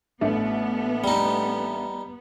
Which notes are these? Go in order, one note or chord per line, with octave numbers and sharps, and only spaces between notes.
A1 A3 B3 D4
G3 D#4